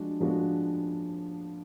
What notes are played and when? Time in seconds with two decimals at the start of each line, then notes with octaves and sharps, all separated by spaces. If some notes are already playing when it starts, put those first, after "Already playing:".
Already playing: F3 G#3 D4 F#4
0.20 F3 G#3 B3 D4 F#4